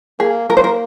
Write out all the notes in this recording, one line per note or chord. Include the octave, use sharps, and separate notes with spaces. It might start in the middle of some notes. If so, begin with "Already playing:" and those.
A#3 G#4
A#3 A#4
C5
A#4